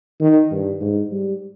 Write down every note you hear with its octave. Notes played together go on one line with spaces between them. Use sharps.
D#3
G2
G#2
G3